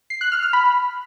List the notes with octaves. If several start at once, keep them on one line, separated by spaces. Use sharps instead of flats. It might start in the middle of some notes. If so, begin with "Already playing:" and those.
C7
F#6
F6
F6
B5